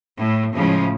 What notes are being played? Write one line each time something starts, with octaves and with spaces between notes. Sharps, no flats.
A2
A2 C#3 F3 G#3